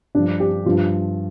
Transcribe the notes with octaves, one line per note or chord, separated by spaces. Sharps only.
G2 F3 D4
G4
G2 F3 F4